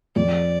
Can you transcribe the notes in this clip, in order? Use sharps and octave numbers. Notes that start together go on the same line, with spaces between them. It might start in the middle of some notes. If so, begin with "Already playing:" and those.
F2 D5